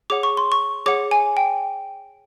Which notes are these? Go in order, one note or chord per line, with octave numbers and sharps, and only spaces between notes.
G#4 C#5 F#5 D6
C#6
C6
C#6
G#4 C#5 F#5 D6
G#5
G5